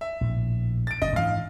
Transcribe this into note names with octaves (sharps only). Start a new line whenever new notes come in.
E5
A#1 A2
A6 D7
F#1 C#4 D#5
G#2 E3 D4 F5